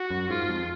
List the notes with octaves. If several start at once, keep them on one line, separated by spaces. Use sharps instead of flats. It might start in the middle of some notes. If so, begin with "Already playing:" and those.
Already playing: F#4
F#2
G#2 F4
F2